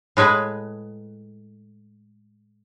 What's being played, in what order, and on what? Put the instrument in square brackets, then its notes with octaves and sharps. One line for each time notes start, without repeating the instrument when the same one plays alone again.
[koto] A2 G#3 G#4 B4